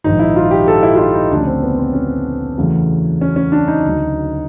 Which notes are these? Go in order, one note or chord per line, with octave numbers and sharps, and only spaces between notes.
A#1 G#2 D#3 D#4
E4
F4
G4
A4
E4
F4
E4
D#4
D2 C#3 F3 A3 D4
C#4
C4
B3
C4
C#4
E2 C#3 F#3 A3
C#4
C#4
D4
D#4
D2 C#3 F#3